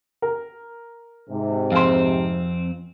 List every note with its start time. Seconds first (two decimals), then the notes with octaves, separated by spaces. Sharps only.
0.22 A#4
1.28 G#2 C3
1.72 F2 C4 F5 G#5 C6